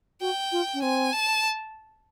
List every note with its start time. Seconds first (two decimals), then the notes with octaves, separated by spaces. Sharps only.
0.21 F#4 G5
0.52 F4
0.74 C#4
0.82 C4 G#5
1.12 A5